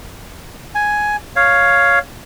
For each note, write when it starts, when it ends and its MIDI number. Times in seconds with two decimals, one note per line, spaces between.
0.75 1.16 80
1.36 1.99 73
1.36 1.99 77